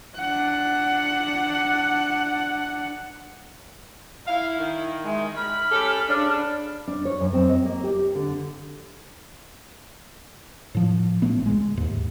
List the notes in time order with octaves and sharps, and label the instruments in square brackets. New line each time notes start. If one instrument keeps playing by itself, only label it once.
[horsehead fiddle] D4 F#5
[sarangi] E4 [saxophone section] F5
[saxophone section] D#3
[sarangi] G#3 [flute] E5
[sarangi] B5 [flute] F6
[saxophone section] C#4 G4 A4
C#3 D4
[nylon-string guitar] D4
C#5
F#2
C4
D#5
A#3
G4
D3
[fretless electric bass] A2 F3
A1 A#2 A3 B3
C#2 G#3
D#2 G#2